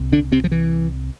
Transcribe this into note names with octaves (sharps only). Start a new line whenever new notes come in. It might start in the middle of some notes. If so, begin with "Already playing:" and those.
Already playing: C2 A#2
D3 D4
C3 C4
F3
E3